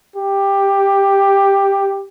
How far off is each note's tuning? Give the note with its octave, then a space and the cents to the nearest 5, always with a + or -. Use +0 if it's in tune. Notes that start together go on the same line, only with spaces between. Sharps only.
G4 +10